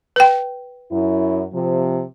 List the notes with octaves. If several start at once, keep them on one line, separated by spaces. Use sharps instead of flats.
B4 G5
F#2 E4
C3 F3